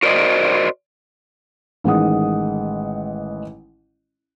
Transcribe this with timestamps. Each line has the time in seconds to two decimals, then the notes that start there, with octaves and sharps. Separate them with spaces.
0.03 F#4 A#4 C5 D5 D#5
1.84 A1 D#3 G#3 F#5 D#6